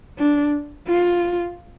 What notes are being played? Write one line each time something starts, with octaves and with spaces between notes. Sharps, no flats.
D4
F4